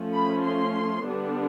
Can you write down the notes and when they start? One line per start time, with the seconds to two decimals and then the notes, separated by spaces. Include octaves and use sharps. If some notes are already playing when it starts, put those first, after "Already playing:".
Already playing: F3 A3 C#4
0.13 B5
0.45 C6
1.05 D3 G3 B3 D4